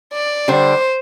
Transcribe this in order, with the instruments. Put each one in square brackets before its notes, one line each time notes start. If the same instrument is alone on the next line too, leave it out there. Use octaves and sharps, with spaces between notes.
[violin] D5
[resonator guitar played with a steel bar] D3 G3 D4 [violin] C5